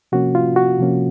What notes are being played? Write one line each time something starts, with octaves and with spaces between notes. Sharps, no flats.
C3 F3 A#3 C#4 F#4
F4
F#4
C3 F3 A#3 C#4